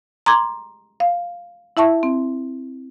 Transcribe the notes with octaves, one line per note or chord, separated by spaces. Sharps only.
A#5 C6 D6 G#6
F5
E4 E5 A5 C#6
C4